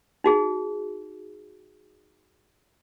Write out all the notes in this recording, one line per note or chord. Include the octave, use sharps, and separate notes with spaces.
D#4 F#4 G#4